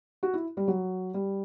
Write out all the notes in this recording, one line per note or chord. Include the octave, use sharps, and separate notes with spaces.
F#4
E4
G3
F#3
G3